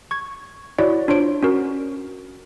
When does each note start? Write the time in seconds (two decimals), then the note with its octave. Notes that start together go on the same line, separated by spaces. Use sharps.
0.11 C#6 G#6
0.79 E4 F#4 C#5 D5
1.08 D4 F4 C5 C#5 D7
1.43 C#4 F#4 A#4